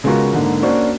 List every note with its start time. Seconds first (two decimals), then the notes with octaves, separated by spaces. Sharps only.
0.04 C#3 G#3 B3 F4 F#4 A#4
0.33 G#2 D3 A#3
0.62 A#3 C#4 D4 F#4 C5